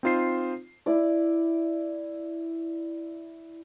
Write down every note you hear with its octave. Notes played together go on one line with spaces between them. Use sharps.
C4 D#4 F4 C5 C7
E4 D5